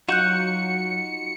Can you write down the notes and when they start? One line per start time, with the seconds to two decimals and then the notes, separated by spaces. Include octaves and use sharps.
0.09 F#3 D#4 F4 F#4 F#6 G6 C#7 E7